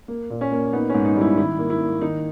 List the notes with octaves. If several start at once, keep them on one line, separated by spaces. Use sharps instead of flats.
A#3
A#2
C#4
A#3
B3 D#4
G#2 C#4
D#4
G3
E4
D#3 E4
A#3
E4
A#3
D#3 D#4